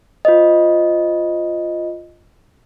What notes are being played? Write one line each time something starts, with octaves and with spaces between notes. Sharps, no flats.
F4 C5 D#5